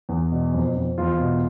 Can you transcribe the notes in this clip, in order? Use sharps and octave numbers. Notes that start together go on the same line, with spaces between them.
E2
B2
F2
F2
E2 F4
B2